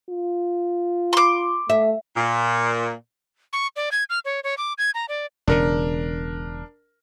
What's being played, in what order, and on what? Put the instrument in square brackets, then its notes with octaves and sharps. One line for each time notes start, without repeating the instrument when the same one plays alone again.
[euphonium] F4
[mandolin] C6 D6
[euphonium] A3 [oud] E5
[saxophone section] A#2
[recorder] C#6
D5
G#6
F6
C#5
C#5
D6
G#6
A#5
D5
[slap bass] E1 C#3 [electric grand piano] D4 A#4